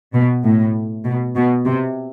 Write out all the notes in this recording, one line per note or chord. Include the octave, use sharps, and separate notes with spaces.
B2
A2
B2
B2
C3